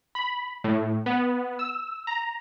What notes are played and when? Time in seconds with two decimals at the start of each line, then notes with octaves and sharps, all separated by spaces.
0.15 B5
0.64 A2
1.06 B3
1.59 E6
2.07 A#5